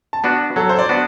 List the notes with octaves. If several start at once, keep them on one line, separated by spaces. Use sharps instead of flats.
A5
B3 D4 F#4
F#3 A4
C5
D5
B3 D4 F#4